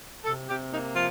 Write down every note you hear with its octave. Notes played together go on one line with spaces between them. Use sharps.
C3 A4
C3 G4
A#3 D#4
F3 F4